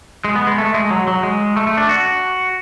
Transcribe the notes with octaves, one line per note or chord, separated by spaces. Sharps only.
G#3
B3
G#3
A3
G#3
F#3
F#3
G#3
A3
A3
D4
F#4